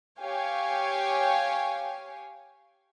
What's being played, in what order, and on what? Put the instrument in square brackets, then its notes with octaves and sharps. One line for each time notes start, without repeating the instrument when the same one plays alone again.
[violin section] G4 C#5 F5 G#5